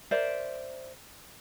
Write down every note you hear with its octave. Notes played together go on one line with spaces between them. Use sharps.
A#4 C5 D5 E5